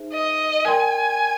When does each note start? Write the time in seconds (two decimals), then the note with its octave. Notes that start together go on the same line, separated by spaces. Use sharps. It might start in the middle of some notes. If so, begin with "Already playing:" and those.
Already playing: D#4 G#4 C5 E5
0.12 D#5
0.65 A#4 D5 G5 G#5 C6